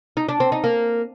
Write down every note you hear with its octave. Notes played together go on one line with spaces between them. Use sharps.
D#4
D4
C4
D#4
A#3